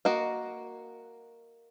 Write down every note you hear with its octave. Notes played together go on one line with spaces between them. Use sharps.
A#3 F#4 D#5